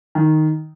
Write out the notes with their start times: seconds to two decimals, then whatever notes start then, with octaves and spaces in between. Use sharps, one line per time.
0.15 D#3